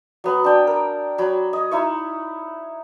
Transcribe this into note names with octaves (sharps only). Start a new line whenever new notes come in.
F#3 B3
D4 G5
A#4
F#3 B5
D#5
D#4 E4 C#5